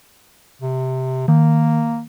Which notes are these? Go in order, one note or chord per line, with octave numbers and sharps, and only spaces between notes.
C3
D#3 A#3